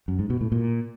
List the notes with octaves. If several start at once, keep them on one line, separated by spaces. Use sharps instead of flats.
F#2
G#2
B2
A2
A#2